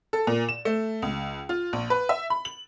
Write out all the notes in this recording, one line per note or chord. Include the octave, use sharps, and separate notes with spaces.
A4
A#2
E7
A3
C#2
F4
A#1
B4
E5
B5
F#7